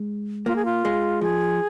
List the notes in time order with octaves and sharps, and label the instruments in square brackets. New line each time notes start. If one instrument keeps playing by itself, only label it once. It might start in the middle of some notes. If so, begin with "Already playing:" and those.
Already playing: [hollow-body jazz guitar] G#3
[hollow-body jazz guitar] A#3 [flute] F4
[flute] G#4
F4
[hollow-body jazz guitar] G#3
[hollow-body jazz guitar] F3 [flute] G#4